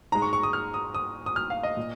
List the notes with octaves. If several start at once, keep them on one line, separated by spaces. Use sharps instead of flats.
G#2 G#3 A#5
C#6
C#6
D#6
F6
D#6
D#6
D#6
F6
F5
D#5
A#2